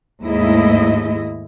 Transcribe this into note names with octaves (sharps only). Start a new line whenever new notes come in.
D#2 G#2 G#3 A3 E4 D#5